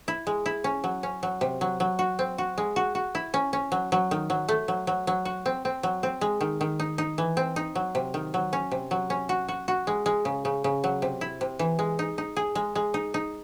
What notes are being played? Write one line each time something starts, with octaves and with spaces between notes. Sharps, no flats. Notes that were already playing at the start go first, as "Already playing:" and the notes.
E4
G#3
E4
C#4
F#3
C#4
F#3
C3
F#3
F#3
F#4
C4
F#4
G#3
F#4
F#4
E4
C#4
C#4
F#3
F#3
D#3
F#3
A3
F#3
F#3
F#3
F#4
C4
C4
F#3
C4
G#3
D#3
D#3
D#4
D#4
E3
C4
D#4
F#3
C3
D#3
F#3
C#4
C3
F#3
C#4
F#4
F#4
F#4
G#3
G#3
C#3
C#3
C#3
F#3
C3
E4
C3
E3
G#3
D#4
D#4
G#4
G#3
G#3
D#4
D#4